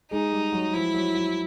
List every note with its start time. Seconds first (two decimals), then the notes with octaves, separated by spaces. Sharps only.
0.11 G#3 D#4 G#4
0.32 G3 G4
0.53 F#3 F#4
0.73 F3 E4 F4
0.94 F#3 F#4
1.15 F#3 F#4